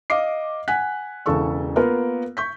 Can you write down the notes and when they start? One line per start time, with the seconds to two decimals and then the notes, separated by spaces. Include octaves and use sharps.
0.10 D#5 F5 D6 C7
0.68 F#5 G#5 F#6 B6
1.26 E1 C#3 E3 A4 C#6 E6
1.76 A#3 B3 F4 A#4
2.37 C#6 G6 B6